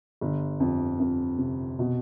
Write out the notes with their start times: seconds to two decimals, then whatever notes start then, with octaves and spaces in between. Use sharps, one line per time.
0.21 G1
0.60 F2
1.00 F2
1.38 C3
1.79 B2